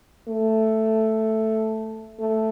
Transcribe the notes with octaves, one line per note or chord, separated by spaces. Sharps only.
A3
A3